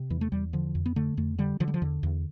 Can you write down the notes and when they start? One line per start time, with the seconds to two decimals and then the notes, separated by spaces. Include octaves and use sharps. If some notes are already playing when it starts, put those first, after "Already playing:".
Already playing: C3
0.10 E2 E3
0.21 A3
0.32 E2 G3
0.53 D3 F3
0.75 F2
0.86 B3
0.96 D3 A3
1.17 F2 A3
1.38 D3 G3
1.60 D3 F3
1.68 G3
1.74 F3
1.82 E2 D3
2.03 E2